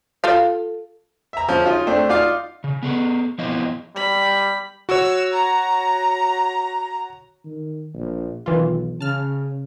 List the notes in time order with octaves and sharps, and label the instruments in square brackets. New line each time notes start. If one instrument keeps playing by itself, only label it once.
[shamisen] F4 A4 F5
[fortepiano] E5 A#5
F3 C#4
C#4 D#4 F4
A3 C4 D4
D#4 F4 D5 F5
[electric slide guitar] C#3
B3 G#4 A4
F3 B3 C4 E4 D#5
[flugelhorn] G3 [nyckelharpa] B5
[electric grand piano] F#4 C#5 [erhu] E6
[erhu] A#5
[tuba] D#3
A#1
[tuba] B1 [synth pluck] D#3 E3 F4
[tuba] C#3 [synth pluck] A5 F6